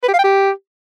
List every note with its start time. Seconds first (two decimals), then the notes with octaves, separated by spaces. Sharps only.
0.03 B4
0.08 G4
0.13 F5
0.18 G5
0.24 G4